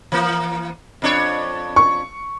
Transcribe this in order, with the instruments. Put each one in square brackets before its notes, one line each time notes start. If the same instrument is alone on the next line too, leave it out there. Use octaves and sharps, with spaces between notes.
[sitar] E3 A#3
F2 D4 C#5
[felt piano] C#6